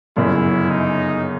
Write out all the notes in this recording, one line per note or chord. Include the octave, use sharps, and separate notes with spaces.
G1 F#2 C#3 E4
D#4